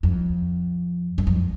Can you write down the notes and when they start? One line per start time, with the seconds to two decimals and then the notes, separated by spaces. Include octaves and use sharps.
0.03 F2
1.18 F#2
1.27 F2